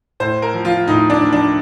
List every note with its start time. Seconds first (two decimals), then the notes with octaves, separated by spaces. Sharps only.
0.20 A2 C5
0.42 A#4
0.54 F3
0.65 F4
0.87 A2 D#4
1.10 D4
1.22 F3
1.33 D4